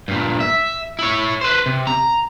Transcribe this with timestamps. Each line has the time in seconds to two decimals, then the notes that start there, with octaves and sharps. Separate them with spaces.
0.08 G2 A#2
0.40 E5
0.99 E4 C#5
1.41 B4 C5
1.66 C3
1.87 A#5